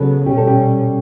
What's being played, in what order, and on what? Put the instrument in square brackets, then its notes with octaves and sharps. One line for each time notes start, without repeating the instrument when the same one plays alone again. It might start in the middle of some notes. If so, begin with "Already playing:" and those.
Already playing: [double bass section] C#3 F#3 B3 [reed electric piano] A4
[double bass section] B2 G3 C#4 [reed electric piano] G4
[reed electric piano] A4
G4